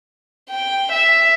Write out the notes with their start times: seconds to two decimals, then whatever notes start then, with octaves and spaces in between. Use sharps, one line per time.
0.50 G5
0.92 E5